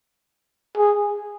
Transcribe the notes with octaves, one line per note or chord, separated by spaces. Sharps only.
G#4